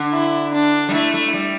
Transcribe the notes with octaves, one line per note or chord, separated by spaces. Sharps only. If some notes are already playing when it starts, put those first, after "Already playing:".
Already playing: D3
E4
D4
G3
A3 E4
A3
G3